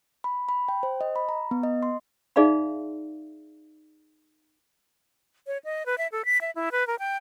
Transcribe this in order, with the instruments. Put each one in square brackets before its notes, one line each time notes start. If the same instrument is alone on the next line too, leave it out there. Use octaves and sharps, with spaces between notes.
[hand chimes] B5
B5
G5
C5
D#5
B5
A#5
B3
D#5
C6
[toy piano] D#4 G#4 D5 E5 F5 B5
[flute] C#5
D#5
B4
E5
A4
B6
E5
E4
B4
A#4
G5